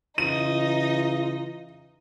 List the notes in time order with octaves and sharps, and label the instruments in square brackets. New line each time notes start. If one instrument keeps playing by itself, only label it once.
[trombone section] C#3 E3 F4 [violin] D#4 D#5 [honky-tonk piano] D#7